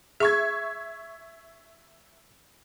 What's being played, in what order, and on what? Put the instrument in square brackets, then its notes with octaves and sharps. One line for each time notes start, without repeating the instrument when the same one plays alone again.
[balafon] G#4 [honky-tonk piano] E5 C#6 G#6